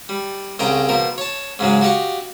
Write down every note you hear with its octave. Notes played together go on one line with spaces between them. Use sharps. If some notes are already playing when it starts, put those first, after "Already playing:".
G3
C2 C#3 D#5 G5 A#5
B2 F3 A#4
C#5 A5
G#2 C#3 F#3 G#3
F#4 G4 D#5 F5 C#6